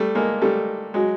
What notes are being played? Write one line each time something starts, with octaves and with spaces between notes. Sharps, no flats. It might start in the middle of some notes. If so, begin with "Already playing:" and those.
Already playing: G3 A3
G#3 A#3
G3 A3
F#3 G#3